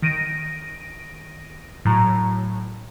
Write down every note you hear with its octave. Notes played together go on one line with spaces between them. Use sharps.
D#3 A#6 D7 D#7
A2 F#3 A#5